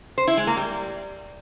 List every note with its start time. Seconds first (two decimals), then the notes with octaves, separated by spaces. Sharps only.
0.18 C5
0.27 E4
0.37 G#3
0.47 A#3
0.57 G3